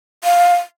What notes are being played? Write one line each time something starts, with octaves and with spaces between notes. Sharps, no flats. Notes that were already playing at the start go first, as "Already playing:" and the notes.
F5